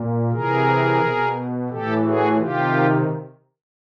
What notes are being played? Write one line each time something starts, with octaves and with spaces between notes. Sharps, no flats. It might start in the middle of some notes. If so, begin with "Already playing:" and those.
Already playing: A#2
C3 E3 G#4 A#4
B2
A2 E3 G4 A4
F#4 G#4
C3 D#3 F4 G4